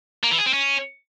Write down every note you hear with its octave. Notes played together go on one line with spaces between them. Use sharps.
A#3
E3
G#4
C4
C#4